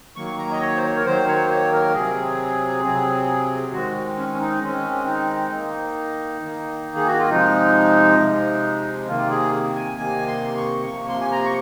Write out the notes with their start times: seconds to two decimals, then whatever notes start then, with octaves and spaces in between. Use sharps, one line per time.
0.16 D#3 F#3 A#3 C#6
0.38 A#5
0.51 D#5
0.61 C#5
0.77 C5
0.83 C#5
0.97 A#4
1.06 D#3 F#3 A#3 C5
1.28 C#5
1.46 C5
1.51 C#5
1.73 A#4
1.95 C3 F#3 C4 G#4
2.84 C3 F#3 C4
3.73 D#3 G#3 C4 F#4
4.18 C#4
4.32 C#4
4.40 D#4
4.63 D#3 G#3 C4 C#4
5.07 D#4
5.52 D#3 A#3
6.41 D#3 A#3
6.96 G#4
7.07 F#4
7.19 F4
7.30 C3 F3 G#3 D#4
8.19 C3 F3 G#3
9.08 C3 D#3 A#3 F4
9.30 G#4
9.76 G#5
9.97 C3 D#3 A#3 G#5
10.27 C6
10.57 C#6
10.86 C3 F3 A#3 C#6
11.09 C6
11.21 G#5
11.31 A#5
11.45 C#6